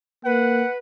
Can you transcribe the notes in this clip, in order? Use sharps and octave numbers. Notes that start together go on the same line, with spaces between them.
A#3 B4 F#5